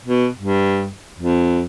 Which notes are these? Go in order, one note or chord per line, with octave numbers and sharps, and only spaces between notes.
B2
G2
F2